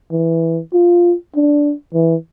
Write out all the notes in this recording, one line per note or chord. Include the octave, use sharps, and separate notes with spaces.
E3
F4
D4
E3